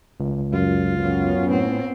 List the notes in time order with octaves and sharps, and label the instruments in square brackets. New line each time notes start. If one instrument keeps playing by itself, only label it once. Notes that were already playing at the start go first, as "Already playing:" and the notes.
[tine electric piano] C#2
[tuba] F#2 [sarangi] F4
[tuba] F#2 [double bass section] B3 C#4
[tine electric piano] A2 [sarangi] C4